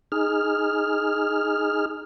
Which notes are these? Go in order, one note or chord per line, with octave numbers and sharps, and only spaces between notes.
D#4 G#4 F6